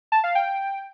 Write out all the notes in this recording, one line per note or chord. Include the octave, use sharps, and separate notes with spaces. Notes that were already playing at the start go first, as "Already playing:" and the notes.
A5
F5
G5